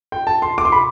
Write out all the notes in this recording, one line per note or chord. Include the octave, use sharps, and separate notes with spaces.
G5
A5
C6
D6
C6
B5